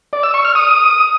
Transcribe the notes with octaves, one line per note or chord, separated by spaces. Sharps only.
D5
E6
C#6
F6
D#6